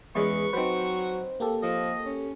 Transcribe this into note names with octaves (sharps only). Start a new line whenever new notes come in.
E2 G#3 C#4 B4 C#6
F#3 C4 D#4 B4 C5
A#3 G4 A4
F3 D#5
C#4